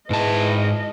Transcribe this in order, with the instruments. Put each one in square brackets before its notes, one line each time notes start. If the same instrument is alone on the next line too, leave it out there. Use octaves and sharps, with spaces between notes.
[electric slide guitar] G#2 A5 [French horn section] E4 G#4 B4 [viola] D#5